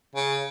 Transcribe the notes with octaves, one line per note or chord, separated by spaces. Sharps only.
C#3